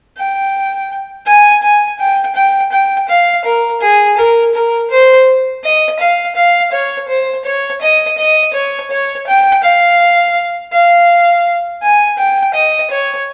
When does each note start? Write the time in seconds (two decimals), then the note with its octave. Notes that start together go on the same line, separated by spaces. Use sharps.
0.17 G5
1.26 G#5
1.63 G#5
1.99 G5
2.35 G5
2.72 G5
3.09 F5
3.44 A#4
3.81 G#4
4.17 A#4
4.54 A#4
4.90 C5
5.63 D#5
5.99 F5
6.35 F5
6.72 C#5
7.08 C5
7.45 C#5
7.81 D#5
8.18 D#5
8.54 C#5
8.90 C#5
9.27 G5
9.63 F5
10.72 F5
11.82 G#5
12.18 G5
12.54 D#5
12.90 C#5